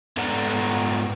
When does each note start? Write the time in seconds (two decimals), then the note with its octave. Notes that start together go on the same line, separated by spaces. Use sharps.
0.17 G#2 B3 A4 D5 F#5 A#5